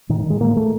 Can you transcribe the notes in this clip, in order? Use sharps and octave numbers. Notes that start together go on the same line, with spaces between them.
A2 D#3
D#3
G#3
A2 A#3
A3